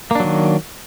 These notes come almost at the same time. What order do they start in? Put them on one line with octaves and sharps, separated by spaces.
A#3 D4 F#3 D#3